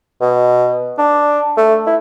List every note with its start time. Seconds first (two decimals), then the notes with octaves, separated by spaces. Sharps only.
0.21 B2
0.98 D4
1.57 A3
1.87 E4